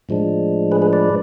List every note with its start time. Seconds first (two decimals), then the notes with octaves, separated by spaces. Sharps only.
0.09 A2 F3 G#3 D4
0.72 G#4 B4
0.82 G#4 B4
0.93 B4 D5